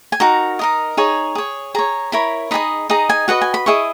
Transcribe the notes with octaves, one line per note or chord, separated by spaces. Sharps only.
G#5
D#4 F#4 A#4 A#5
D#4 A#4 D#5
D#4 G#4 C#5
G#4 C#5
G#4 C#5 A#5
E4 A#4 C#5 B5
D#4 G#4 D#5 B5
D#4 G#4 D#5 A#5
G#5
F#4 B4 D#5 F#5
G#5
B5
E4 G#4 D#5 C#6